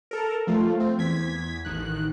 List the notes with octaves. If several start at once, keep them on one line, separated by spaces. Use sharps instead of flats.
A4 A#4
F3 A3 F4
C4
E2 G#6 B6
A1 D#3 F#6